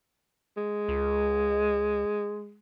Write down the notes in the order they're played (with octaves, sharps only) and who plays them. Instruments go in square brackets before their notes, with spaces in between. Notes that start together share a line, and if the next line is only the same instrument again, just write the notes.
[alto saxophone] G#3
[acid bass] C#2